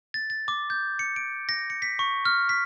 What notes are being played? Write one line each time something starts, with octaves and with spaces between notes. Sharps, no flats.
A6
A6
D6
G6
C#7
D7
A#6
C#7
B6
C#6
F6
B6